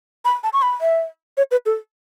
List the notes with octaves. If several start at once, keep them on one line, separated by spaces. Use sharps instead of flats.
B5
A5
C#6
B5
E5
C#5
B4
A4